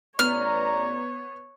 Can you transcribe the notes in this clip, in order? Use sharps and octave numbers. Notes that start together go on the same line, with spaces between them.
A1 B3 C#5 D5 A#5 F6